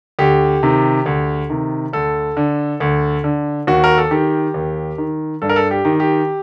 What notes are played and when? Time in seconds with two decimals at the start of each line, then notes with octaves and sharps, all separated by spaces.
0.19 D2 G4
0.63 C3 D#3
1.06 D2
1.50 C3 D#3
1.93 D2 A4
2.37 D3
2.80 D2
3.24 D3
3.67 D#2 F#4
3.84 A#4
3.98 A4
4.11 D#3 G4
4.54 D#2
4.98 D#3
5.42 G2 A4
5.49 A#4
5.56 A4
5.71 G4
5.85 D#3
6.00 G4